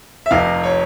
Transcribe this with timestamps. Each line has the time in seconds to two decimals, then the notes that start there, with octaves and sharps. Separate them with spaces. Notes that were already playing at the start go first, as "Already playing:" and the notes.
0.26 E5
0.31 F1 F2 C3 F5
0.63 C#5